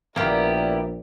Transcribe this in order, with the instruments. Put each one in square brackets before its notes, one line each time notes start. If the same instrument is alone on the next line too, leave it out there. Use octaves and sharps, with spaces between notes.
[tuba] A#1 [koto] A#3 G5 [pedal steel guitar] B3 E4 G4 [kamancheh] A#4 D5